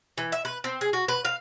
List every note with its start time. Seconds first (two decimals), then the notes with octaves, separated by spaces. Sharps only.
0.18 E3
0.32 E5
0.45 B4
0.64 C4
0.81 G#4
0.93 F#4
1.08 B4
1.25 F5